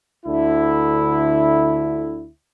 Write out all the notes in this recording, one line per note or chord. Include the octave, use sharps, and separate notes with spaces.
D2 D3 E4